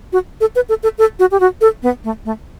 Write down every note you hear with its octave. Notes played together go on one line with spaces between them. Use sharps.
F#4
A4
B4
A4
A4
A4
F#4
G4
F#4
A4
B3
A3
A3